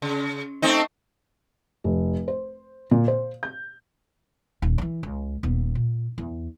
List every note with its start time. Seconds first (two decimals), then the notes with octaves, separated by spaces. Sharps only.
0.02 C#3
0.62 A3 C4 D#4
1.84 F1
2.28 C5
2.91 A#2
3.08 C5
3.43 G6
4.62 D#1
4.78 D3 E3
5.03 C#2
5.43 D#1 B3
5.75 A#2
6.18 E2